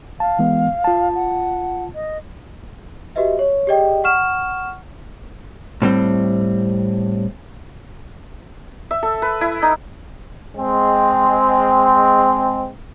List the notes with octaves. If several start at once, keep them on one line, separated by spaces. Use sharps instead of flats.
F5 A5
E3 G#3 B3
F4 A5
F#5
D#5
F#4 G4 B4 D#5 E5
C#5
G4 G#4 D5 D#5 G5
F#5 C#6 F6 E7
A2 G3 C4
E5
A4
B4
E4
D#4
G#3 C4